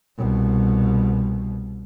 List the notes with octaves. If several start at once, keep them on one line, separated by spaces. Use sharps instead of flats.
C2 B2